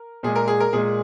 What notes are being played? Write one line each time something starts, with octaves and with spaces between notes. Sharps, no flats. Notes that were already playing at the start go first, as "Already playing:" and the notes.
Already playing: A#4
A#2 G#3 G#4
A#4
G#4
A#4
A#2 G#3 G#4